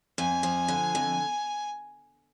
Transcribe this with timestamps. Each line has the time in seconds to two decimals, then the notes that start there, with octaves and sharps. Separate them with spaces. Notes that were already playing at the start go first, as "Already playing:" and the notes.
0.18 F2 G#5
0.43 F3
0.68 D3
0.95 F2